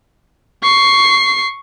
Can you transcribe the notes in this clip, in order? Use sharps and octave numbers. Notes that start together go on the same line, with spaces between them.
C#6 C7